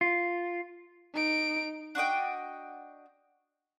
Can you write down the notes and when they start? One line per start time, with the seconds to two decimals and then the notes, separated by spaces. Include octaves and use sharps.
0.01 F4
1.14 D#4 D7
1.95 D4 F#4 D#5 G5